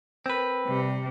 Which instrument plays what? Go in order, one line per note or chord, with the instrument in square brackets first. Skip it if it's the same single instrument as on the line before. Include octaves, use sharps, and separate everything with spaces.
[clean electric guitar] C4 B4 [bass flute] A#4
[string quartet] C3 [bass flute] G3